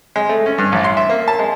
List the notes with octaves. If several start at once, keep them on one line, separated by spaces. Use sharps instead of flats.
G#3
A3
C#4
G2
A1
C6
E5
A#3
A5
G#3